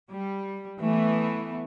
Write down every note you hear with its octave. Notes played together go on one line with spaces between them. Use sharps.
G3
E3 A3 B3